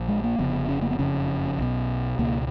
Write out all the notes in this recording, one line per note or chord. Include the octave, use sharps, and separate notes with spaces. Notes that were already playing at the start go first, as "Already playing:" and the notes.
Already playing: A#1 A#2
G#3
A#3
F1 F2 C#3 B3
C#4
A#3
B3
F#1 F2 C#3 C#4
B1 B2
C#2 B2 A#3